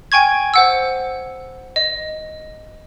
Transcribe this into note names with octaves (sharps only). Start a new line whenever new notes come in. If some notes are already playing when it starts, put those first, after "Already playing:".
G5 G#5 C#6 G#6
C5 F#5 E6
D#5